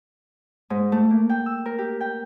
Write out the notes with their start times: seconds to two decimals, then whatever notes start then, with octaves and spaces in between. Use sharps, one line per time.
0.70 G#2
0.92 A3
1.10 A#3
1.30 G5
1.46 E6
1.66 A#4
1.78 G4
2.01 G5